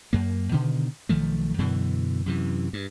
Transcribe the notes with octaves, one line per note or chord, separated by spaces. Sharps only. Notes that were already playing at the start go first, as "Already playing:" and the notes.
F#2 A#3
B2 D3 D#3
B1 D#3 F3 A3
F#2 B2 D3 E3
F#2 C3 E3
G2